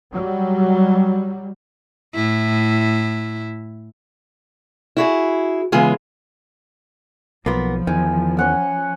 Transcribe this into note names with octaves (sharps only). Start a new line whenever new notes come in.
F#3 G3
A2 E4
E4 F#4 G#4
C#3 E3 G#3 B3 F4 G#4
B1 F3 A#3 B3 F4 B5
E2 D#3 G#5
C#4 F#5 G#5